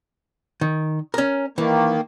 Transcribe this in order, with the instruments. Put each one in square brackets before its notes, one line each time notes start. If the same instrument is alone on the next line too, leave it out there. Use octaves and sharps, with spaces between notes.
[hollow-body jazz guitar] D#3
C#4 A#4
[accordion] D#3 A#3 [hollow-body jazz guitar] E3